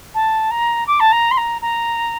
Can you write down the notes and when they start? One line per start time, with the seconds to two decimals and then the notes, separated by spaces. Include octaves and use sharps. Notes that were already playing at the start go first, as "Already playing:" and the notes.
0.14 A5
0.51 A#5
0.87 D6
1.00 A5
1.12 A#5
1.31 C6
1.37 A#5
1.62 A#5